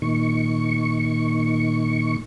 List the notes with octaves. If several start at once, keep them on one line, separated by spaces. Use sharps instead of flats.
A#2 D#3 C#6